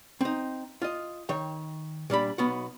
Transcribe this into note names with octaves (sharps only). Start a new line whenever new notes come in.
C4 D#4
F4 D#5
D#3 C#5 G5
A#2 G3 D4 B5
B1 B3 F#4